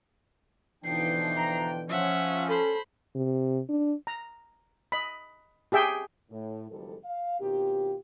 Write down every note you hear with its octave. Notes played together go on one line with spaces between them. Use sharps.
B2 D3 E3 F3 D4 D#4 G5 C7
A#5
F3 C#4 E5 F#5
A4 C5 B5
C3
D4
A#5
D#5 B5
G4 G#4 E5 G5
A2
F#1 D#3 F3 G3 G#3 A4
F5
B2 D#3 C4 F4 G4